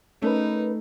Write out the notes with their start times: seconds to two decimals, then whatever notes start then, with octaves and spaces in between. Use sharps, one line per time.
0.22 A3 C#4 D#4 A#4 B4